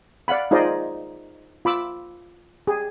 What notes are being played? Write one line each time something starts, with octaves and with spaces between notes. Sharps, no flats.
D5 F5 F#5 B5
D#4 F4 G#4 C5 D5 D#5
F4 B5 D6 E6
G4 G#4